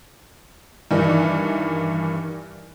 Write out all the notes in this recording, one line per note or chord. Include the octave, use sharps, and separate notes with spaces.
G2 D#3 E3